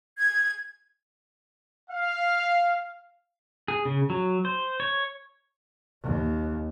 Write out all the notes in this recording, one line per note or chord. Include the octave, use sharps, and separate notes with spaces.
G#6
F5
G#4
C#3
F#3
C5
C#5
D#2